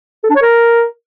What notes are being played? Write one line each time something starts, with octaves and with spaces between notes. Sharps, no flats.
A4
D4
C#5
A#4